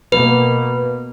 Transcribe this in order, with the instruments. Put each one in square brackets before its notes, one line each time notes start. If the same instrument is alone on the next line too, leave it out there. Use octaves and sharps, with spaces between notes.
[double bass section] B2 A#3 B3 [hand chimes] B4